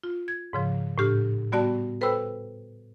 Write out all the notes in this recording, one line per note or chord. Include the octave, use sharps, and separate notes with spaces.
F4
G#6
G#2 C#3 F3
A2 D4 G4 F6
G3 B3 F#4 D5 A5
A4 B4 C5 G5 B5 E6